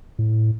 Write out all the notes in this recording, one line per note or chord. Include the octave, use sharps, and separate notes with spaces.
A2